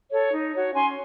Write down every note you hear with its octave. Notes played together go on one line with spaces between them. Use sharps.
A4 C#5
D#4
F#4 C#5
C#4 G#5 C6